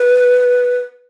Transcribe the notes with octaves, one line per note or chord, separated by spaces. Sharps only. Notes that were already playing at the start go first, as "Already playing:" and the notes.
Already playing: B4